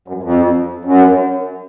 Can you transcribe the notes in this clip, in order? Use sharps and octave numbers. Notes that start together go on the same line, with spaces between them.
F#2
F2
F#2